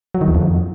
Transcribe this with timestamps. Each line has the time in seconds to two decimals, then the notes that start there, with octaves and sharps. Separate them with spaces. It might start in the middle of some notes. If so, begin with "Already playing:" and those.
0.15 F#3
0.21 D#3
0.28 E2
0.35 F2